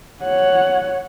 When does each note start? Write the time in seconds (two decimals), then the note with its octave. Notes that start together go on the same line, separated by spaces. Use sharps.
0.23 C#5 F#5